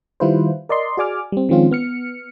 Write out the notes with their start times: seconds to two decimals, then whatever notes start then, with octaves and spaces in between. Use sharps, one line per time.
0.20 D#3 G3 E4 F4 B4 C5
0.69 A#4 D5 D#5 C6
0.97 F#4 G#4 D5 G#5 D6 F6
1.32 G3 C4
1.49 D#3 F3 G#3 C4 C#4 F4
1.71 B3 F6 C#7